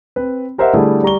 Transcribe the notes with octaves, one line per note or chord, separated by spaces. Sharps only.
C4 B4
G4 A#4 C5 D#5 E5 F#5
D3 G3 A3 E4 G#4
G3 A#5 C#6 G7